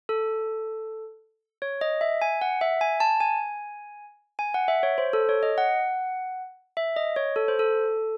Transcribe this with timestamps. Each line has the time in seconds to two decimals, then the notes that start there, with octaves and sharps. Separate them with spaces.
0.09 A4
1.62 C#5
1.81 D#5
2.01 E5
2.22 G#5
2.42 F#5
2.61 E5
2.81 G#5
3.00 A5
3.20 G#5
4.39 G#5
4.54 F#5
4.68 E5
4.83 C#5
4.98 C5
5.13 A4
5.29 C#5
5.43 D#5
5.58 F#5
6.77 E5
6.96 D#5
7.16 C#5
7.36 A4
7.48 C5
7.59 A4